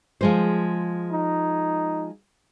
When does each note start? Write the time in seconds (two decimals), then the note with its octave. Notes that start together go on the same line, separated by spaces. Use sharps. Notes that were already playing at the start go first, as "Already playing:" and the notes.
0.21 F3 G#3 C5
1.11 D#4